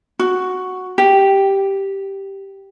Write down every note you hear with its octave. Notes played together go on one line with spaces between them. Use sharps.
F#4
G4